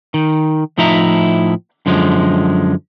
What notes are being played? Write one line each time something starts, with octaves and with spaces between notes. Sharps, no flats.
D#3
A2 F3 D#4 E4 E5 A#5
F#2 D3 F3 G#3